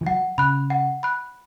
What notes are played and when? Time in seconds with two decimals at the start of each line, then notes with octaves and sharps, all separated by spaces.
0.01 E3
0.06 F#3 F#5
0.38 C#3 B5 F#6
0.70 F#5
1.03 B5 F#6